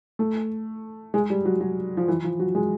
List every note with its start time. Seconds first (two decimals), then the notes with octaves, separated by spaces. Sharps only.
0.19 A3
1.14 G#3
1.30 G3
1.45 F#3
1.61 F#3
1.97 F3
2.08 E3
2.24 F3
2.39 F#3
2.55 G#3